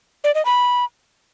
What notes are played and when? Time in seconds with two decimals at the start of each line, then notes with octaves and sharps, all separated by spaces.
0.24 D5
0.35 D#5
0.45 B5